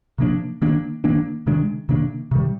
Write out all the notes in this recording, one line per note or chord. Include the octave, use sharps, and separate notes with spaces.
C3 F3 A#3 D4
D#3 A#3 D4
D#3 A#3 D4
C3 D#3 G#3 D4
C3 D#3 A#3 D4
C3 D#3 G3